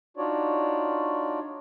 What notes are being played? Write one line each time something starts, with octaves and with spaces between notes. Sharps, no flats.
D4 D#4 F4 F#4 C#5 D5